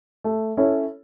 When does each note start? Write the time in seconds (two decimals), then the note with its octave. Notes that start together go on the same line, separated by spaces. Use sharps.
0.24 A3
0.57 C#4 E4 A4 C#5